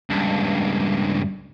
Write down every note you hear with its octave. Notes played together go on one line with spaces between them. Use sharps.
C#2 G2